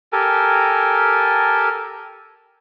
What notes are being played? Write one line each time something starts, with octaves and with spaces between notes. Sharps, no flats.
G4 A4 A#4 G#5